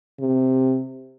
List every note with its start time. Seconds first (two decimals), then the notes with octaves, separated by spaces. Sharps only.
0.20 C3